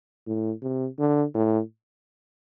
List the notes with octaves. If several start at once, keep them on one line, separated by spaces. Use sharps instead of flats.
A2
C3
D3
A2